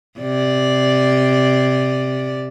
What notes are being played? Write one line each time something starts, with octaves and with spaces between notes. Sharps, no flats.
C3 D5